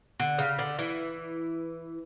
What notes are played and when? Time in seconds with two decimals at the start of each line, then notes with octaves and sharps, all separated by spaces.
0.20 D3
0.39 C#3
0.59 D3
0.79 E3